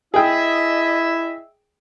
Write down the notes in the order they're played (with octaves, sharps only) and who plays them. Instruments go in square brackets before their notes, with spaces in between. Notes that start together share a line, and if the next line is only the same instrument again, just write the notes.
[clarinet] E4 [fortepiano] G#4 G5 [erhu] D#5 [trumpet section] E5